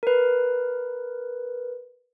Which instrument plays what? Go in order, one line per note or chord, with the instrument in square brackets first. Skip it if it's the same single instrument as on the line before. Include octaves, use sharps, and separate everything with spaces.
[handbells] A#4 B4